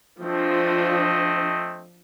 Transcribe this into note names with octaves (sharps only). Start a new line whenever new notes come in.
F3 A3 C4 D4 D#5